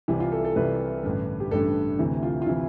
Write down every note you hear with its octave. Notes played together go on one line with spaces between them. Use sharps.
C2 C3 E3 G4
F4
A4
A4
C2 C3 E3 B4
A1 G2 D3
G4
A1 G2 D3 A4
D2 C3 E3
F4
F4
C3 E3 E4